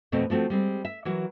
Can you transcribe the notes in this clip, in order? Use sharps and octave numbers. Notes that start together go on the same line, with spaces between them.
F2 B2 A3 C4
F3 A3 C4 F#4
G3 G#3 C4
E5
E3 F#3 F#4 A#4